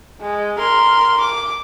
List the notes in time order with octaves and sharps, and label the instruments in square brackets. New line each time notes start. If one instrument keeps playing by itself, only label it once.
[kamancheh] G#3
A#4 C6
D6